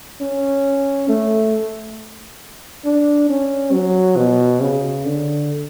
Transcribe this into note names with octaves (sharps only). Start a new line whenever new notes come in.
C#4
A3
D4
C#4
F#3
B2
C#3
D3